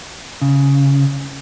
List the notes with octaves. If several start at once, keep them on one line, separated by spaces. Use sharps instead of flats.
C#3